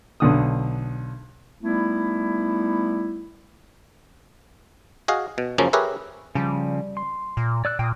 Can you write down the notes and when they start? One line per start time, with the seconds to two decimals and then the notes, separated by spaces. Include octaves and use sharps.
0.20 B1 D3 D#6
1.62 G3 A3 B3 D#4 E4
5.08 F#4 G#4 D#5 F5
5.38 B2
5.58 F#2 C#3 F3 A#3 C#4
5.73 G4 G#4 A#4 B4 C#5 E5
6.35 C#3 F3 G3
6.97 C6
7.37 A#2
7.65 D5 E6 F#6
7.79 A#2 G5 D#6